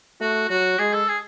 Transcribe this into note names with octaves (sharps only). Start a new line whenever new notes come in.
A3 F#4
F#3 F#4
G#3 G#4
A4
G#4